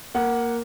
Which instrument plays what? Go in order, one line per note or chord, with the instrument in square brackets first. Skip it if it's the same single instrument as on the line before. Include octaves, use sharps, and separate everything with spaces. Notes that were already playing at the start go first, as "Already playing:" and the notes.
[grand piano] A#3 F#5